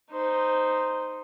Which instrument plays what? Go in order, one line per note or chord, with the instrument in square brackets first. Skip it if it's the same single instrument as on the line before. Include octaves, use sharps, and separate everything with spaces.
[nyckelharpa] D#4 C5